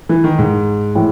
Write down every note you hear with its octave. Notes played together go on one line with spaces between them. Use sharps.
E3
D#3
G#2
A2 E3